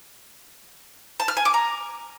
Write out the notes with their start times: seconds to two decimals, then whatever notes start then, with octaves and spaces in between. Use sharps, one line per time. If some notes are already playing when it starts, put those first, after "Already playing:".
1.20 A5
1.28 F6
1.37 G#5
1.45 D6
1.54 A#5